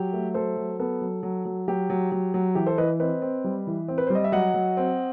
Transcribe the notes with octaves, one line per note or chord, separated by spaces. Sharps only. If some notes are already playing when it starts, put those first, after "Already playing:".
Already playing: F#3 G4
A3
F#3 A4 C5
F#3
B3 A4
F#3
F#3
F#3
F#3 G4
F#3
F#3
F#3
E3 G4
A4 C5
E3 B4 D#5
C4 B4 D#5
C4
G3
E3
C4
B4
G3 C5
D#5
E5
F#3 D#5 F#5
F#3
C4